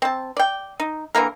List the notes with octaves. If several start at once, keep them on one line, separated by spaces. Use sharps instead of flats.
C4 A5
D5 G5
D#4
D3 E3 A#3 A#4